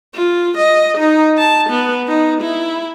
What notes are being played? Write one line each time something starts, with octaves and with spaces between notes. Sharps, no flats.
F4
D#5
D#4
A5
B3
D#4
E4